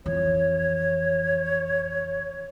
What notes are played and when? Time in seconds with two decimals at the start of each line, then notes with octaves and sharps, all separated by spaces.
0.06 F2 E3 C#5